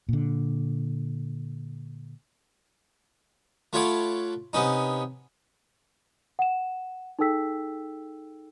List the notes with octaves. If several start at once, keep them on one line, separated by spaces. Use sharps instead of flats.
A#2 D3
A3 F4 C#5 F#5 B5 D6
C3 B3 C#4 D#4
F#5 E7
D#4 G#4 A4 G5 E6 B6